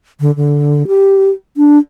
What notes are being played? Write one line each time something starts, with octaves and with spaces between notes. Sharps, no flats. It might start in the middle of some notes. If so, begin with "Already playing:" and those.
D3
D3
G4
D4